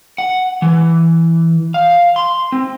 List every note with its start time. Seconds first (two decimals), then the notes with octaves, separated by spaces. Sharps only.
0.18 F#5
0.62 E3
1.74 F5
2.16 C6
2.52 C4